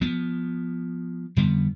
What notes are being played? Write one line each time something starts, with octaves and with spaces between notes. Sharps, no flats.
F3 B3
F2 D3 G3 B3